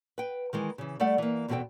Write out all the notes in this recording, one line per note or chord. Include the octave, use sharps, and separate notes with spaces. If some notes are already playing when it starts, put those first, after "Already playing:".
B4 G5
D#3 E3 G#3
C#3 E3
G3 A3 A4 D5 F#5
E3 A#3
E2 B2 C4 F#4 A4 G5